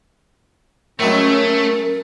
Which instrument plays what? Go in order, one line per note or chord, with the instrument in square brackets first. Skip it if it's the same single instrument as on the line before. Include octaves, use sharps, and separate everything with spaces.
[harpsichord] A2 F#3 G#3 [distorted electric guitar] A3 [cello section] C#4 [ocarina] A#4